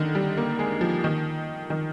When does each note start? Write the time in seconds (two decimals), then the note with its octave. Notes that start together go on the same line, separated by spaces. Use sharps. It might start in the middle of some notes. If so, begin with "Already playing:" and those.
Already playing: D3 D#3
0.15 G3
0.37 A#3
0.59 G#3
0.81 F3
1.04 D#3
1.70 D#3